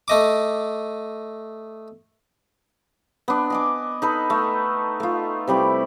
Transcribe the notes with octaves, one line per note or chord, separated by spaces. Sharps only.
A3 D#5 D6
B3 D4
D#5 G#5 D6
D#4 A4 B4
A3
A3 F4
C3 G3 E4 G4